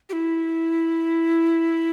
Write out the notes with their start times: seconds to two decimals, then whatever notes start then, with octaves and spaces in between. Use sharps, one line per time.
0.09 G4
0.13 E4